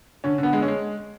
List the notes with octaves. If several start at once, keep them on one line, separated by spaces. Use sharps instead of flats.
D3 C#4
D3
B3
G#3
C#4
G#3